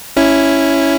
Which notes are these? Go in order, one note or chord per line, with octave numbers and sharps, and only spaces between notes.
C#4 E4